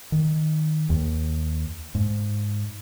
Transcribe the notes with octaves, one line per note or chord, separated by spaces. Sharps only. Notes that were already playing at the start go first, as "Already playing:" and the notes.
D#3
D#2
G#2